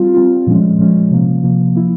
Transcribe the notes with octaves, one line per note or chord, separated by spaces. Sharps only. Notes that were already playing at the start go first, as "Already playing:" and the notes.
Already playing: G3 C4 F4
G3 C4 F4
A#2 F3 G#3 C#4
A#2 F3 G#3 C#4
C3 F3 A#3
C3 F3 A#3
F3 A#3 E4